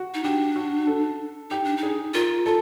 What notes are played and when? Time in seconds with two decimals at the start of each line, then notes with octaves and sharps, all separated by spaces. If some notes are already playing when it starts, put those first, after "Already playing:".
Already playing: F#4
0.14 D#4
0.24 D4 G4
0.56 F#4
0.87 A4
1.50 D#4 G4
1.64 D4
1.77 D#4
1.83 G#4
2.14 F4 A#4
2.46 F4 A4